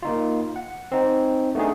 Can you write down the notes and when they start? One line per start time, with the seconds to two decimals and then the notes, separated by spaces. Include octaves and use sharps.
0.03 A#3 D#4 F4
0.56 F#5
0.92 C4 D#4
1.55 A3 B3 D4 D#4 G#4